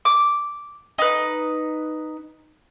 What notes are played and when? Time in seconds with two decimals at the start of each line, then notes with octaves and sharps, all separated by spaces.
0.05 D6
0.98 D#4 B4